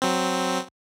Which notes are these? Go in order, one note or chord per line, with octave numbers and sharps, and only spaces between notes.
F#3 C4